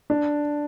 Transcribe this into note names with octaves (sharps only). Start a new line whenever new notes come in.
D4